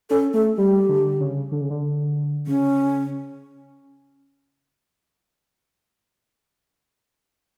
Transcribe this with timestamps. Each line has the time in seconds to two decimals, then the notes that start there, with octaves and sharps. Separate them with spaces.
0.10 C#4 A4
0.34 A3 A4
0.57 G3 G4
0.89 D3
1.20 C#3
1.52 D3
1.61 C#3
1.70 D3
2.47 C#3 C#4